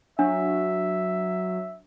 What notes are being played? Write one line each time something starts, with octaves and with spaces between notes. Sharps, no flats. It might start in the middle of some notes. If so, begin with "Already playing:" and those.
F#3 D4 E5